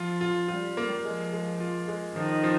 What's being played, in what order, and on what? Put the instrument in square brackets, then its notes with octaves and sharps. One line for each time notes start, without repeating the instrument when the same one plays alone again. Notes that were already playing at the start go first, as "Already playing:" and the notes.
Already playing: [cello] F3 [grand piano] F4
[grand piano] F4
[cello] G3 [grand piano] F4
[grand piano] A#3
[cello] F3 [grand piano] G#3
[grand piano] G#3
F4
G#3
[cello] D#3 [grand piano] F3
[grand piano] F3